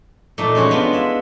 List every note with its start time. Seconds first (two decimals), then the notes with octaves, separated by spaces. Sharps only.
0.38 A#2 A3 D#4
0.55 G#3 C#4 F#4 C#5
0.70 G#3 B3 D4 F4
0.93 E4 E5